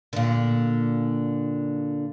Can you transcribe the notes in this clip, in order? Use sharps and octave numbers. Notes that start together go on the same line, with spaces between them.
A#2 D3